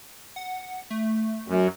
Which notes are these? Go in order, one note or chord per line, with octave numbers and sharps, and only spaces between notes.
F#5
A3
F#2